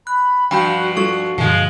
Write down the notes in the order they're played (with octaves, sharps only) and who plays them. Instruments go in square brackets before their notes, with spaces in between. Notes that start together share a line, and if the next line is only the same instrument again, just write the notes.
[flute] B5 [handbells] F#6
[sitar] G2 F3 [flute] F#4 [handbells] G5 B5 G6
[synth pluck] G3 F4 [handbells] D4 A4 C#6 [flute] F#4
[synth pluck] G2 B2 D3 [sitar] F3 G#3